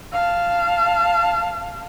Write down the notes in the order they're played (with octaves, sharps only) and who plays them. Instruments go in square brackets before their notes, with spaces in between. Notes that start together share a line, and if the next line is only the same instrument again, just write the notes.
[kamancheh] F5 A5